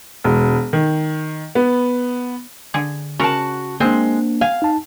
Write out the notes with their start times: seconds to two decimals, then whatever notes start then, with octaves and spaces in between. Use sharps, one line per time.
0.24 E1
0.73 D#3
1.55 B3
2.74 D3 G#4
3.19 C#3 F#4 A#4 A5
3.80 G#3 A#3 C4 D4
4.41 F5 G#5
4.62 D#4 A5